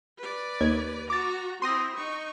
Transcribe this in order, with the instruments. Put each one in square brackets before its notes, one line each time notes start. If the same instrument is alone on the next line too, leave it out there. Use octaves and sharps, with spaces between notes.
[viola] B4 D5
[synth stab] D#2 G#6
[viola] F#4 A#5 [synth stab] D6 A6
[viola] C4 E4 [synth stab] C6 D#6 A#6
[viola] D#4 C#6